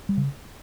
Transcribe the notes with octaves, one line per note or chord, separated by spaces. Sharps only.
G3
C#3